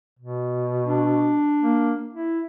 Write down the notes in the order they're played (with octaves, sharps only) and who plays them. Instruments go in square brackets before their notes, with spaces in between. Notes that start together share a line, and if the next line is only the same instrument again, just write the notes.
[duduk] B2
[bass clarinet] D4
[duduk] A#3
E4